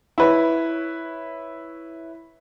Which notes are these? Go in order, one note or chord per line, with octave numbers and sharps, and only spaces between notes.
E4 B4 C#5